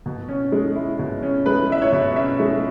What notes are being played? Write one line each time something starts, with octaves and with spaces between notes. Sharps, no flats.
B2
C#4
G#3
E4
B2
C#4
G#3 B4
E4 E5
C#5
B2
C#4 E5
G#3